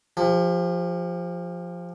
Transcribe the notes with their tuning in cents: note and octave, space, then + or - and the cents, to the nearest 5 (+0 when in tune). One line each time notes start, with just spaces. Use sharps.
F3 +0 G4 +35